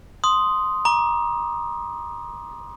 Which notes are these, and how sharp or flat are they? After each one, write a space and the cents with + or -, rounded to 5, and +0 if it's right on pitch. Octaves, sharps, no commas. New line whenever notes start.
C6 +0 D#6 +0
A#5 +30 D6 +15